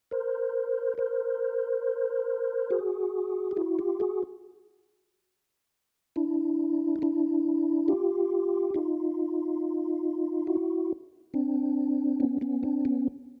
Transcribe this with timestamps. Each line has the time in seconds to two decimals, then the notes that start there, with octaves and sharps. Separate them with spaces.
0.11 A#4 C5
0.98 A#4 C5
2.70 F#4 G#4
3.51 G4
3.57 E4 F#4
3.79 F4 G4
4.00 F#4 G#4
6.16 D4 E4
6.96 D#4
7.02 D4 E4
7.88 F4 G4
8.74 D#4 F4
10.47 E4 F#4
11.34 C4 D4
12.20 B3 C#4
12.41 B3 C#4
12.63 C4 D4
12.85 B3 C#4